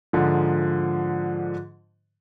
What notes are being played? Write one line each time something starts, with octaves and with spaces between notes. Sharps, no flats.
G#2 D3 F3